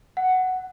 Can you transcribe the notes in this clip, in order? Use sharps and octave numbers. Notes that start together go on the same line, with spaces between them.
F#5